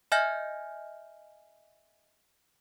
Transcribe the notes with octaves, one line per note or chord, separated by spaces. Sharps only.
D#5 E5 G#5 F6 G6 A#6